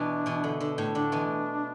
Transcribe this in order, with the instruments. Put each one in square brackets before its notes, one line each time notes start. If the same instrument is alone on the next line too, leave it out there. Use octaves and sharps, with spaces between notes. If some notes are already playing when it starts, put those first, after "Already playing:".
Already playing: [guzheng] B2 E3 [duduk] D4
[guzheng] B2 E3
D3
D3
A2
[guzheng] D3 [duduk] D4
[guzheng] B2 E3